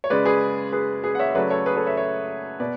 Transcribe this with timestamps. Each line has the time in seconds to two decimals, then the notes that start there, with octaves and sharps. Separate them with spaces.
0.04 C#5
0.10 C#3 G#3 B4 D5
0.25 G#4 B4
0.72 G#4 B4
1.04 G#4 B4
1.15 F#5
1.19 C#5 E5
1.31 E5
1.35 C#3 F#3 A3 B4 D5
1.50 A4 C#5
1.66 G#4 B4
1.76 A4 C#5
1.87 C#5 E5
1.97 C#5 E5
2.60 B2 B4 D5